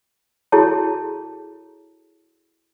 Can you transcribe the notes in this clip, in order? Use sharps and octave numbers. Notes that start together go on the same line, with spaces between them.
E4 F#4 G#4 A4 C#5 A5